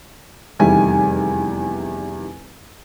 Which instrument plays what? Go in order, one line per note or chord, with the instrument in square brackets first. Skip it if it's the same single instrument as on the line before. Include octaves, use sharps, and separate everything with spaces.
[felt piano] F1 E2 D#3 G3 E4 G#5